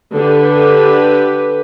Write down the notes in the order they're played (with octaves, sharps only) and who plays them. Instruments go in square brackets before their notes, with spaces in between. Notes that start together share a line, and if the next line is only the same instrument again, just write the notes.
[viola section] D3 G4 B4